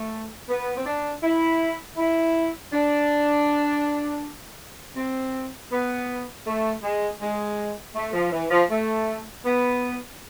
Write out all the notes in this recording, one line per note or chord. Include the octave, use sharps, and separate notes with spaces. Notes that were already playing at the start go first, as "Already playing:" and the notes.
Already playing: A3
B3
C4
D4
E4
E4
D4
C4
B3
A3
G#3
G#3
A3
F3
E3
F3
A3
B3